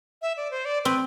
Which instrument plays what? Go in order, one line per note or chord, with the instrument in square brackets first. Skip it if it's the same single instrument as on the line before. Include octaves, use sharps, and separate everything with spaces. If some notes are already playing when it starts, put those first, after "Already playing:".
[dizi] E5
D5
C5
D5
[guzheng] C4 [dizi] B4